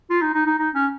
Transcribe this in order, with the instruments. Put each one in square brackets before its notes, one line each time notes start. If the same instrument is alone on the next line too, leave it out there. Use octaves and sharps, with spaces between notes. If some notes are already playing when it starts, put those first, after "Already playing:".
[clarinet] F4
D#4
D#4
D#4
D#4
C#4